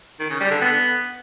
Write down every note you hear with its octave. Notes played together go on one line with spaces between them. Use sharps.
D#3
C#3
G3
D3
B3